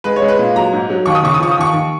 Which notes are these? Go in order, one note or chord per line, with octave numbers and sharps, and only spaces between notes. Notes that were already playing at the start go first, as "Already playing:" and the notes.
G#3 B4
C#5
G#3
B4
A#2
F#3 A#5
G#2
F#3
D#2 C#6
D#6
C#3 C#6
D#6
F3 C#6
D#6
D#2 C#6
D#2